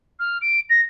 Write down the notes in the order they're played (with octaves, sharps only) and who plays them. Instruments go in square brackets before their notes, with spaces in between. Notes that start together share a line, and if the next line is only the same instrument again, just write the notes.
[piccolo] F6
D7
A#6